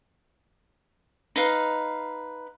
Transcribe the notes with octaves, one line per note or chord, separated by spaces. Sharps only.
D#4 B4 F5